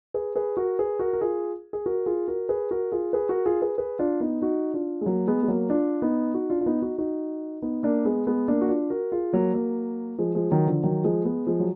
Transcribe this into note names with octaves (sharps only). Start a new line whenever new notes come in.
G#4 B4
G#4 B4
F#4 A#4
G#4 B4
F#4 A#4
A#4
F4 G#4
G#4
F#4 A#4
F4 G#4
F#4 A#4
G#4 B4
F#4 A#4
F4 G#4
G#4 B4
F#4 A#4
F4 G#4
G#4 B4
G#4 B4
D4 F4
B3 D#4
D#4 F#4
D4 F4
G#3
F#3 A#3
G#3 B3
G#3
F#3 A#3
D4 F4
B3 D#4
D#4 F#4
D4 F4
F4
B3 D#4
D#4 F#4
D#4 F#4
B3 D#4
A#3 D4
G#3 B3
G#3 B3
A#3 D4
F#4
D4 F4
F#4 A#4
F4 G#4
F#3 A#3
F#3 A#3
F3 G#3
F3 G#3
D#3 F#3
D3 F3
D#3 F#3
F3 G#3
G#3 B3
F3 G#3
F#3